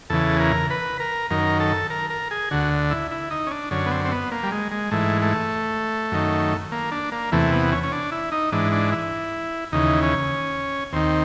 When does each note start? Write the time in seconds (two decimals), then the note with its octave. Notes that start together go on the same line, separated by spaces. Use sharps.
0.10 E2 C#3 E3 A4
0.40 A#4
0.70 B4
1.00 A#4
1.30 F#2 D#3 A#4
1.60 A4
1.90 A#4
2.10 A#4
2.31 G#4
2.51 D2 D3 F#4
2.91 E4
3.11 E4
3.31 D#4
3.47 C#4
3.51 D4
3.71 F#2 D3 C#4
3.86 B3
3.91 C4
4.05 C4
4.11 B3
4.31 A#3
4.43 G3
4.52 G#3
4.72 G#3
4.91 G#2 E3 A3
5.22 A3
6.12 F#2 D#3
6.72 A#3
6.92 D4
7.12 A#3
7.32 E2 C3 E3 A3
7.52 B3
7.72 C#4
7.83 C#4
7.92 D4
8.12 E4
8.32 D#4
8.52 G#2 E3 D4
8.72 D4
8.92 E4
9.72 D#2 C#3 E3 D#4
10.03 C#4
10.93 D#2 D#3 C4